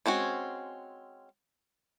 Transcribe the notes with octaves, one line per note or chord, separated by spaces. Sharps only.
G#3 C4 C#4 F#4